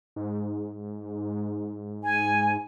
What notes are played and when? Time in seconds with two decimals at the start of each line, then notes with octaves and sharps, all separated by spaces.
0.16 G#2
2.02 G#5